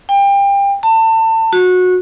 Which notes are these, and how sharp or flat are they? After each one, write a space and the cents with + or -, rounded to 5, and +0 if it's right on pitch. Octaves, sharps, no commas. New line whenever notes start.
G5 +30
A5 +30
F#4 -20